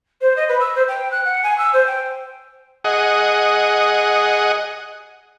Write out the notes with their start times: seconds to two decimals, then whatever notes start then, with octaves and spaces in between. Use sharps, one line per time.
0.21 C5
0.36 D#5
0.48 B4
0.60 E6
0.75 C5
0.88 G5
1.11 F#6
1.25 F#5
1.43 G#5
1.58 E6
1.73 C5
1.86 G5
2.85 G#4 D#5 F#5